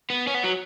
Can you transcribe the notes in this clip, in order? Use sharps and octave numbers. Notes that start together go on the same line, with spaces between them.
B3
C#4
B3
F#3